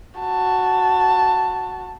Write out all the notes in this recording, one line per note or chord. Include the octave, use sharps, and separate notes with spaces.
F#4 A5